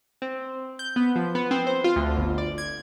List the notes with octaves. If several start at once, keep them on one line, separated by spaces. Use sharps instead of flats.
C4
G6
B3
F3
B3
C4
C5
F4
D2
G1
D5
G#6